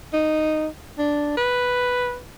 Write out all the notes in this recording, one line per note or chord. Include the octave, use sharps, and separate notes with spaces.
D#4
D4
B4